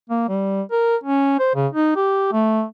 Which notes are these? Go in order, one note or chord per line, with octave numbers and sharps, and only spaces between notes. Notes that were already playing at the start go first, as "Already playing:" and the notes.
A#3
G3
A#4
C#4
C5
C#3
D#4
G4
A3